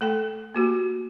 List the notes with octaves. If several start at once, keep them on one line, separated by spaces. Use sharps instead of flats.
A3 A4 G5
A#3 F#4 G4